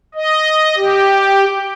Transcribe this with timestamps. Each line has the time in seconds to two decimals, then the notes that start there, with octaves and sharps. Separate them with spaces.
0.15 D#5
0.76 G4